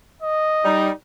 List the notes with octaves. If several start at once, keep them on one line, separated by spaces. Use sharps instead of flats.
D#5
G3 D#4